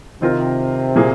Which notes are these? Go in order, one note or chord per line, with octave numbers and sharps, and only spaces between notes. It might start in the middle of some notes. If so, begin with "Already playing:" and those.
C3 D#3 C4 F4 A#4
A#2 A#3 G#4